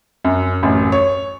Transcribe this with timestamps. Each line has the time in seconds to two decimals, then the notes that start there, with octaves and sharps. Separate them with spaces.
0.25 F#2
0.63 A1 F#2
0.92 C#5